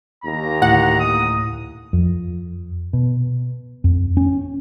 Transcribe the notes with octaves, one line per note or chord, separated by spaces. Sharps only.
D#2 A#5
D2 A2 F#5
D#6
F2
B2
F2
C#4